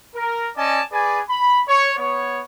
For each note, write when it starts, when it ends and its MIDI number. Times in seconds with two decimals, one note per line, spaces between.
0.15 0.49 70
0.57 0.81 61
0.57 0.81 74
0.57 0.81 75
0.57 0.81 80
0.57 0.81 81
0.92 1.20 68
0.92 1.20 71
0.92 1.20 74
0.92 1.20 80
1.29 1.60 83
1.68 1.92 73
1.97 2.41 59
1.97 2.41 73